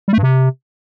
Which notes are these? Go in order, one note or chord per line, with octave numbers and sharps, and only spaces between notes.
G3
A3
G2
C3